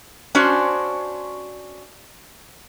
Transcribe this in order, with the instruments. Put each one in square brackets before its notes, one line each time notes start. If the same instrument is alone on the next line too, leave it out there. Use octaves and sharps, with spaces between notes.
[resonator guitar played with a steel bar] C#4 D4 F#4 C5